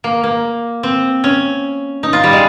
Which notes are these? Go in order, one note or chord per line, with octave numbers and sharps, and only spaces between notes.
A#3
A#3
C4
C#4
D#4
F4
G3
G#3